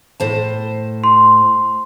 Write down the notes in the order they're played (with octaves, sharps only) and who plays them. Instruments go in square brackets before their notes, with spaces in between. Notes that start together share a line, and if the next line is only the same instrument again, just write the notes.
[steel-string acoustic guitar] A2 C5 A5
[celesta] C6